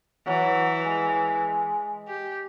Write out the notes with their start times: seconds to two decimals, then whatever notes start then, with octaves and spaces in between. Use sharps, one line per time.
0.27 E3 F#3
0.86 G#3
2.08 G4